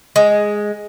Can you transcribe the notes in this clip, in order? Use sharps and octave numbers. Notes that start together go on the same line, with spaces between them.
G#3